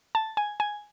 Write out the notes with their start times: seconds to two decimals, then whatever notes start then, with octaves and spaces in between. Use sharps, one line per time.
0.15 A5
0.37 G#5
0.60 G#5